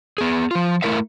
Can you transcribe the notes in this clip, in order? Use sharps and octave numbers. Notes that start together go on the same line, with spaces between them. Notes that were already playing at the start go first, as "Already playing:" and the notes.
B3 G#4
F3 F4
A3 E4 A#4 E5 F5